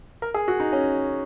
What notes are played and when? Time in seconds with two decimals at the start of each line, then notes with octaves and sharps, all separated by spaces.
0.22 A#4
0.34 G#4
0.48 F#4
0.60 D#4
0.73 C#4